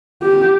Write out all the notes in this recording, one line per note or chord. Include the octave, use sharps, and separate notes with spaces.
G4